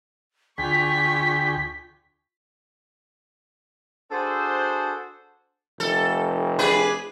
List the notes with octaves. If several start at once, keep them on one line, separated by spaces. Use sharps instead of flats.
D2 F4 G#4 G5 C#6 B6
D4 F#4 G#4 A4 C5
F1 A4
D4 G#4 B4